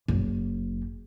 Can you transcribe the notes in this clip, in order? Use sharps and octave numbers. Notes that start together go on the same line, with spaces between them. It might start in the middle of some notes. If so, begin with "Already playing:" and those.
F#1